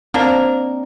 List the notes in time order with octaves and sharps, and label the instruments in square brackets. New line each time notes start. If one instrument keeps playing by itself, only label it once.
[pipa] A#3 D4 A#4 [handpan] C4 D#4